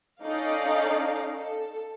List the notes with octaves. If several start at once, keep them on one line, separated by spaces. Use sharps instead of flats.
C#4 D#4 A4 D5 D#5 F5
A4